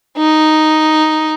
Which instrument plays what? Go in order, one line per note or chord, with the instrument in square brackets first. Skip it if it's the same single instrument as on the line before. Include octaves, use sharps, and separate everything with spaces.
[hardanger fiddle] D#4